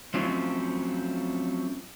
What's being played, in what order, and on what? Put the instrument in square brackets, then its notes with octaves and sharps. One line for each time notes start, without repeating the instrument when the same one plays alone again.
[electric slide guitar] F3 F#3 A3 C4 C#4 F4